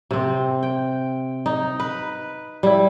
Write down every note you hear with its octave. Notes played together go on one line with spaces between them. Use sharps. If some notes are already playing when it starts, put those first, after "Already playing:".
C3 C4
G5
D#4
B4
G3 E4